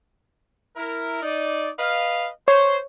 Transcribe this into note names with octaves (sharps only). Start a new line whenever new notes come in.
E4 A#4
D#4 D5
B4 D#5 F5
C5 C#5